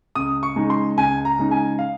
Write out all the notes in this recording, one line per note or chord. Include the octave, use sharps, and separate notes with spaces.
C#2 D#6
C#6
C#3 G#3 D#4
C6
C#2 G#5
A#5
C#3 G#3 D#4
G#5
F5